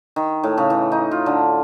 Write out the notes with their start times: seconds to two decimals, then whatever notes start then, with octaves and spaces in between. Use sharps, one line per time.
0.16 D#3
0.44 A2
0.58 C#3
0.70 E3
0.92 D#4
1.11 F4
1.26 D3